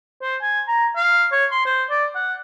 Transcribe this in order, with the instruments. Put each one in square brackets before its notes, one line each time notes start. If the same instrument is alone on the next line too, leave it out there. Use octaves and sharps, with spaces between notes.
[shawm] C5
G#5
A#5
F5
C#5
C6
C5
D5
F#5